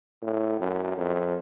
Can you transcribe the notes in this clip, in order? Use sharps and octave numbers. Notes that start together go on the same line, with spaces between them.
A2
F#2
F2